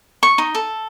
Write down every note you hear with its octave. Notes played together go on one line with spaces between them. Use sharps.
C#6
D#4
A4